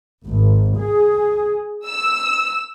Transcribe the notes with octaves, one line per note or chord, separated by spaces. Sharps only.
G#1
G#4
E6